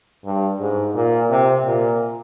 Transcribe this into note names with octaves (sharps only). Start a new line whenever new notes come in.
G2
G#2
A#2
C3
A#2